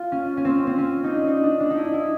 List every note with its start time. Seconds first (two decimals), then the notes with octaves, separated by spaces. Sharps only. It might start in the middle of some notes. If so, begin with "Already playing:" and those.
Already playing: F4
0.12 C#4
0.37 C#4
0.45 C4
0.67 C4
0.78 C#4
1.04 D#4
1.11 D4
1.27 D#4
1.44 D4
1.60 D4
1.70 D#4
1.77 E4
1.93 E4